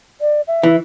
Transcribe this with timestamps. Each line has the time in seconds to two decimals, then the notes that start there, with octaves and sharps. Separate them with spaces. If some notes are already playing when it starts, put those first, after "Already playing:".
0.21 D5
0.47 E5
0.63 E3